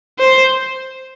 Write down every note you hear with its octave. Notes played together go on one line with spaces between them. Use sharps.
C5